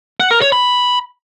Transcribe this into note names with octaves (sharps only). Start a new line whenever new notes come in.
F#5
A#4
C#5
B5